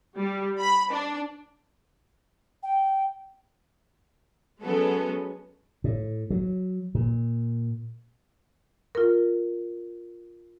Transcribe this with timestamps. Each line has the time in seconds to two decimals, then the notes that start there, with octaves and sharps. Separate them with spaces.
0.17 G3
0.59 B5
0.92 D4
2.63 G5
4.63 F#3 G#3 B3 C#4 A4
5.84 A2
6.30 F#3
6.95 A#2
8.95 F4 A#4